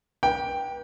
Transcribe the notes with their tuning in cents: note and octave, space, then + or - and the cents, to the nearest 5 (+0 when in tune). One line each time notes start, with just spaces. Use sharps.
B4 -35 G5 +0